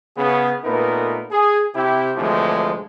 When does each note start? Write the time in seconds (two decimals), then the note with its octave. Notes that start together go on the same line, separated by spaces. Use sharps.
0.17 C#3 B3 G#4
0.64 A#2 A3 B3 D#4 A#4 B4
1.32 G#4
1.75 C3 E4 G4
2.17 D2 A2 C3 E3 F3 G#3